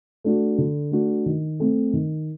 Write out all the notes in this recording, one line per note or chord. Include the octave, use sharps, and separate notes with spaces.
A3 D4 F#4
D3
A3 D4 F#4
D#3
A3 C4
D#3